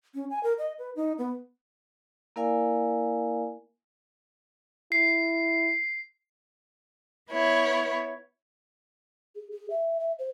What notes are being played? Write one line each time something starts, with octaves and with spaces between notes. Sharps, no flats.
C#4
G#5
A#4
D#5
B4
D#4
B3
A#3 E4 A#4 D5 F5 G#5
E4 C7
B3 E4 C#5
G#4
G#4
E5
E5
C5